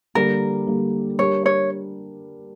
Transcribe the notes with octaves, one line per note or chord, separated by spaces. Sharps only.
D3 G3 A#3 A#4
D3 G3 A#3
G3 D4 G4 A#4 C#5
C#5